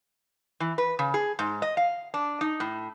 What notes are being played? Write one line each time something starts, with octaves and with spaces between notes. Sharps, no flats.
E3
B4
C#3
G#4
G#2
D#5
F5
D4
D#4
A2